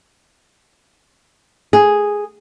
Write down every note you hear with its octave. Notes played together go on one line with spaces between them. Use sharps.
G#4